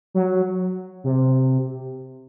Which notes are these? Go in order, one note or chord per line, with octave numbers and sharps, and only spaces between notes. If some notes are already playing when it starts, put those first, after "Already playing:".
F#3
C3